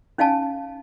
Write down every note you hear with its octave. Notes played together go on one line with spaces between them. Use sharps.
C#4 D#4 F5 G#5 A5